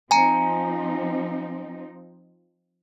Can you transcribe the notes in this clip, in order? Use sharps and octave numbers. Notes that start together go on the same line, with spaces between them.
F3 C4 D#4 G#5 A#5